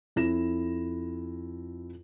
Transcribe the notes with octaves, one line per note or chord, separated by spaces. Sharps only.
F2 E4 A#6 E7